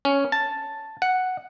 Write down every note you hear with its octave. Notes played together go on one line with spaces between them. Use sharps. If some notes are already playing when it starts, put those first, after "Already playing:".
C#4
A5
F#5